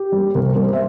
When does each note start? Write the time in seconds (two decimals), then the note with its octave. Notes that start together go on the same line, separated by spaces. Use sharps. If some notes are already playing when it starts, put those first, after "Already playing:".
Already playing: G4
0.12 G3 A#3
0.35 C3 A#4
0.48 A#4
0.55 G3 A#3
0.62 C5
0.73 E5